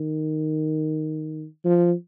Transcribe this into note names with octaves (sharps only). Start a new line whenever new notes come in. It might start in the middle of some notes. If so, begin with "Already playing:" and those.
Already playing: D#3
F3